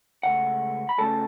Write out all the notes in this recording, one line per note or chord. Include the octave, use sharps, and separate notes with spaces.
C#2 C#3 A3 F#5
B5
F#2 C#3 A3 C#4 A4 A5